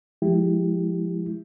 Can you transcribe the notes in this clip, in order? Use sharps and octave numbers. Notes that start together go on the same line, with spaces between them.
F3 G#3 E4 G4